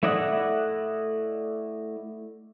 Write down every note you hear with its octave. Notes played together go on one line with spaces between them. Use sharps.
A3 E4 D5 D#5 F#5